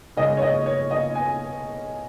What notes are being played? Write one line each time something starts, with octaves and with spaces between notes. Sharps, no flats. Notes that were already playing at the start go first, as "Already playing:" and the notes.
C#3 G#3 C#4 D#5
C#5
D#5
C#5
D#5
G#5